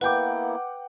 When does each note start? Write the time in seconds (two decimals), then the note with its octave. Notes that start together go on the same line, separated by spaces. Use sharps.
0.01 A#3 B3 E4 B4 F#5 G5 D6 G6